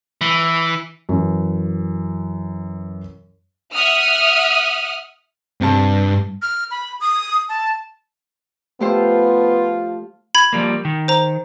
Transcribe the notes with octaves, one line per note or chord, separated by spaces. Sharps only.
E3
F#2 E3
E5 F#5 D#6 F6
G2 C3 A5
F6
B5
D#6
A5
F3 A3 B3 F4 G4 C5
B5 G#6
F3 G3 A#3
D#3
C5 A#5